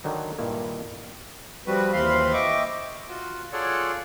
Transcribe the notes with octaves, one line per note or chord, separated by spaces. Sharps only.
D3 D#3 F#3 D#4
G2 A#2 D#3 A#3 E4
F3 G3 C4 F#4 B4
D#2 E3 C4 F5 B5 C6
D#5 E5 G5 C#6 D6
F4 F#4
F4 G#4 A4 C#5 D5 F#5